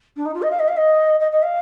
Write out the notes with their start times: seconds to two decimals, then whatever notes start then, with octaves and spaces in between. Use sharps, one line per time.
0.16 D4
0.25 D#4
0.34 F4
0.42 D#5
0.51 F5
0.59 D#5
0.68 F5
0.77 D#5
1.20 D#5
1.31 D#5
1.42 F5